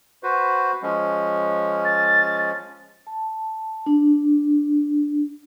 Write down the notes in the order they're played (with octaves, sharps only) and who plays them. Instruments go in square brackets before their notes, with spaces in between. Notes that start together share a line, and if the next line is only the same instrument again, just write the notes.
[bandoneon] F#4 B4 C5
F3 G#3 C#4
[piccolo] A6
[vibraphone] A5
D4